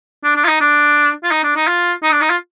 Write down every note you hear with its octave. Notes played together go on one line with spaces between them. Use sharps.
D4
D4
F4
D#4
D4
F4
D#4
D4
D#4
F4
D#4
D4
D#4
F4